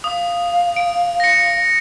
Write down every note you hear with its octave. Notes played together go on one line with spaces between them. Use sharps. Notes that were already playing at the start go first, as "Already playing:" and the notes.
F5 D#6
D7
A#6 C#7